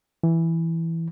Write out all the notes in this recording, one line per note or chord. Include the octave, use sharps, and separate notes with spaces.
E3